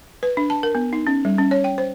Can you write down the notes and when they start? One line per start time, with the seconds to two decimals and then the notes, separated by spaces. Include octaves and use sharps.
0.23 B4
0.37 D4
0.50 A5
0.63 A#4
0.75 B3
0.93 D#4
1.07 C#4
1.25 G3
1.38 C#4
1.51 C#5
1.64 G5
1.78 C5